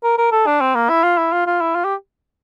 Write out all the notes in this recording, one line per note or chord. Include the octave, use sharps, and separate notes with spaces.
A#4
A#4
A4
D4
C4
A#3
E4
F4
E4
F4
F4
E4
F4
G4